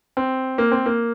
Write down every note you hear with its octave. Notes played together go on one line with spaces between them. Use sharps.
C4
A#3
C4
A#3